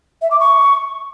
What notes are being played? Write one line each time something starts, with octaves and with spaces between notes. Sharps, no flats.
E5
D6
C#6